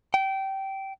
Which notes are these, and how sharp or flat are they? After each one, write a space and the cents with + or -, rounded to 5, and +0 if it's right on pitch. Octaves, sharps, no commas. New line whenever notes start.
G5 -20